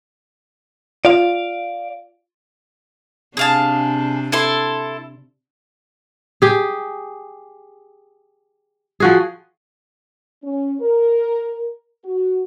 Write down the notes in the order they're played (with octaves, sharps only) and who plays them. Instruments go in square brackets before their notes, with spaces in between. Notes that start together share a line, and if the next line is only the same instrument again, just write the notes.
[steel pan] F4 [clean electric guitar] D5 F5
[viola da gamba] C3 D4 [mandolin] G#4 F5 A5
[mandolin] E4 A4 C6
[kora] G4 G#4
F3 F#4 G#4
[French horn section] C#4
A#4
F#4